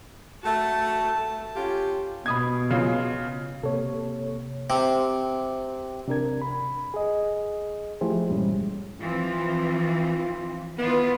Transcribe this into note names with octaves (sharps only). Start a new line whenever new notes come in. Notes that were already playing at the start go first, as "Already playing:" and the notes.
A3 F#4 A5
C#4 F4 G4
B2 B5 D#6 G#6
C#3 F4 F5
C3 A#3 A4 C#5
C3
C3 D4 A#4 G#6
B5
G#4 D#5
F3 A3 E4 G4 G#4 C5
E2 G2 A#2 G3 G#3 C#4
E3 F3 C4 F4
D#3 B3 E4 F4